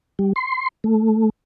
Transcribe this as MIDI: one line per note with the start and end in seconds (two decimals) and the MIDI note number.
0.19 0.33 55
0.36 0.68 84
0.84 1.30 57